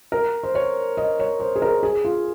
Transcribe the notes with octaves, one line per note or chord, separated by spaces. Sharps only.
A#4
C5
C#5
D#5
C#5
C5
G#4
A#4
G#4
F4